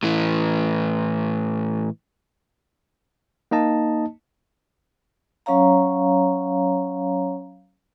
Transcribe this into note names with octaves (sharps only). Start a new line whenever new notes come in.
A2 E3
A#3 D#4 D#5 A5
F#3 C#4 C#5 F5 A#5